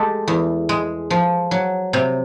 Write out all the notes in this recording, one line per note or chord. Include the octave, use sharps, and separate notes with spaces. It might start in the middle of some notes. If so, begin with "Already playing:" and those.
Already playing: G#3 G4 A4
E2
G#3
F3
F#3
C3